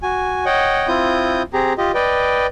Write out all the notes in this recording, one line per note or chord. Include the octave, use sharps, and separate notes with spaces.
F#4 G#5
C#5 D#5 F#5 G5
C4 E4 F4 D#6 G6
C4 G4 G#4 A#5
F4 G4 D#5
B4 D5 D#5 G5